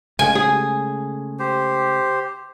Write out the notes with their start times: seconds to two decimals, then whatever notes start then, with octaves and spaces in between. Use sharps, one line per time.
0.19 C#3 G#3 A3 G#5
0.35 G#4
1.39 G4 C5